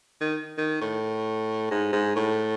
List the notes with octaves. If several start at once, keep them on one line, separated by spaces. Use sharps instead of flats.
D#3
D#3
A2
G#2
G#2
A2